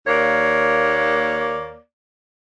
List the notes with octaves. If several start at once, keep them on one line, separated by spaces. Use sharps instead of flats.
D#2 A#3 C#5 D5